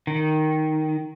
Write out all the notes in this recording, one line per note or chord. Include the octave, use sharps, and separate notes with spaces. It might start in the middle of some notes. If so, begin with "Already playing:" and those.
D#3